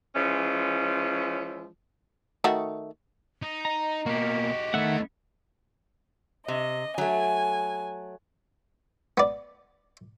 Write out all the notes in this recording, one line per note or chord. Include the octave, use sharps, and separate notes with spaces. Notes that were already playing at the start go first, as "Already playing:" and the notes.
E3 F3 G#3 C#4
D#3 A3 F#4
D#4
D#5 A#5
B2 A#3 F#4 G4
D#3 A3 B3 E4 E5 F#5
C3 D#5
F#3 A3 G#5
B3 D5